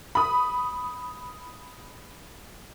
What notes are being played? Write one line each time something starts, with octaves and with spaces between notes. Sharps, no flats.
B5 D#6